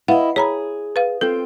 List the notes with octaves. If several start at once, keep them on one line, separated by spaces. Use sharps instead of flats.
E4 B4 D#5 F5 F#5
G#4 C#5 A#5 B5
B4 F5
C4 F4 A4 G5